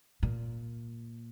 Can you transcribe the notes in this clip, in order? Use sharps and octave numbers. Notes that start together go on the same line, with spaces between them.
A#2